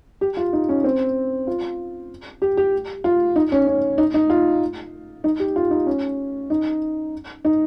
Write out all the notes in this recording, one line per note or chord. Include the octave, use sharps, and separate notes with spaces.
G4
F4
D#4
C#4
C4
F4
G4
G4
F4
D#4
C#4
C#4
D#4
D#4
F4
D#4
G4
F4
D#4
C#4
D#4
D#4